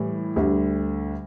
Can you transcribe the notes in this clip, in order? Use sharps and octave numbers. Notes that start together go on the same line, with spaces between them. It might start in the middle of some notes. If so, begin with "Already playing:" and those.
Already playing: A2 E3 G3
D2 D3 G3